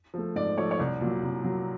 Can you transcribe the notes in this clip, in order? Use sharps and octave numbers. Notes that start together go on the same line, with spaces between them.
F3 A3
G#2 D5
F3 A3 C#5
C#5
C2 D5
A#2 F#3
C2
A#2 F#3